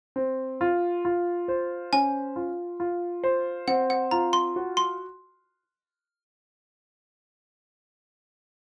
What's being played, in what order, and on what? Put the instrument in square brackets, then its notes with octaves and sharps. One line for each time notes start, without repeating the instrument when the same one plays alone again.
[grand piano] C4
F4
F4
C5
[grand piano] C#4 [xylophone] G#5
[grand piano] F4
F4
C5
[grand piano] C4 [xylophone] F#5
[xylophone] F#5
[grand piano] F4 [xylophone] A#5
[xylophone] C6
[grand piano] F#4
[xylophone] C6